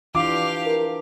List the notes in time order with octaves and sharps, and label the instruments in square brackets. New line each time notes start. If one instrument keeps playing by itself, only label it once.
[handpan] E3 D4 F4 [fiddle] G4 F5 [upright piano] D6
[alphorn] A#4